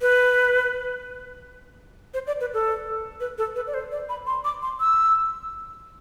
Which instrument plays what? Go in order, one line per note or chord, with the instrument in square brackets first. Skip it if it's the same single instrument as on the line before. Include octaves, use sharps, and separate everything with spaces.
[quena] B4
C5
D5
B4
A4
B4
A4
B4
D5
C5
D5
B5
C6
D6
C6
E6